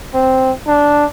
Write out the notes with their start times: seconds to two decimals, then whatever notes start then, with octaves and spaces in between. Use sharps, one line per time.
0.14 C4
0.68 D4